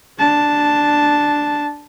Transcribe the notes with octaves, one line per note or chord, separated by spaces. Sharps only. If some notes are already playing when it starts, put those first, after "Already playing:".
D4 A5